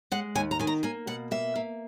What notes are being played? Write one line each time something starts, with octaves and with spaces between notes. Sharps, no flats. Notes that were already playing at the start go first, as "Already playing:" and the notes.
G#3 F#5
D#2 G#5
A#5
D#3 G#5
A#5
A#3 G#5
B2 F#5
A#3 E5
A#3